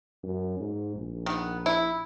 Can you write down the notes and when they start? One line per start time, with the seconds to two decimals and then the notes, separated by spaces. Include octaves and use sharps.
0.24 F#2
0.59 G#2
0.96 A#1
1.26 D#3 B3
1.66 E4